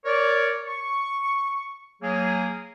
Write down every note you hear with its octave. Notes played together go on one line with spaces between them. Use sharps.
A#4 C#5 D5
C#6
F#3 A#3 G#4